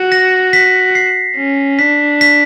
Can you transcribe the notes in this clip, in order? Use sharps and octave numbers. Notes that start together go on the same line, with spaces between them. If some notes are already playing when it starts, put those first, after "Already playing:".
Already playing: F#4
A#6
B6
C7
C#4
D4 B6
B6